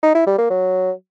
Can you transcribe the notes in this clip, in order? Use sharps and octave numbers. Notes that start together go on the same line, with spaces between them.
D#4
E4
G3
A#3
F#3